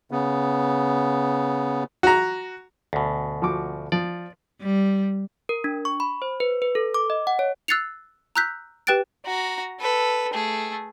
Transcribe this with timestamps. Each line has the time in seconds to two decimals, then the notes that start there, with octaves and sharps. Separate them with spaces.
0.11 C#3 B3
2.03 F#4 A#5
2.93 D2 B2
3.42 F3 F#4 D6
3.92 F3 D5
4.62 G3
5.49 A#4
5.64 D4
5.85 C#6
6.00 B5
6.22 C5
6.40 B4
6.62 B4
6.75 A4
6.94 D6
7.10 D#5
7.27 F#5
7.39 C#5
7.68 E6 F#6 A6 C7 C#7 F7
8.36 A#5 E6 F#6 G6 B6
8.87 G4 B4 G5 F#6 A6 D7
9.26 F#4 A#5
9.80 A4 B4
10.34 A3 G#4